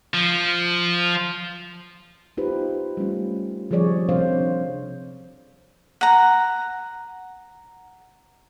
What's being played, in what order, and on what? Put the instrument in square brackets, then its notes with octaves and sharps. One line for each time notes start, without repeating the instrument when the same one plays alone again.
[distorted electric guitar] F3
[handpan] B3 D#4 F4 G4 B4 C5
G3 A3 C#4 F4
D#3 F3 G3 G#4 C#5 D5
C3 F3 C4 D4 C5 F5
[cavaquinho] F#5 A#5